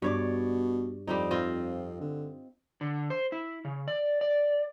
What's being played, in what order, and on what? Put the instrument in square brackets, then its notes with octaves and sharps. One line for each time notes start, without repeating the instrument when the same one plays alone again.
[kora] G2 C#5 D5 [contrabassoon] B2
[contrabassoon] F2 [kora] G3 C4 D#4
[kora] C4 F4 D#5
[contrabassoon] D3
[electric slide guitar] D3
C5
E4
C#3
D5
D5